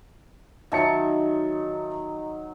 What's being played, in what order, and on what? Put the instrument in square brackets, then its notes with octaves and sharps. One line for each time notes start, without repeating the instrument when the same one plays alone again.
[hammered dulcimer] D#3 F#3 [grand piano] E5 A5 C#7